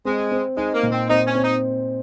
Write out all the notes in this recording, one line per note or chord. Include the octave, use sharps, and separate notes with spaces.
G#3 C4
C4
G#3 D#4
A#3
A#2
C4
C4 D#4
C#4
C4
D#4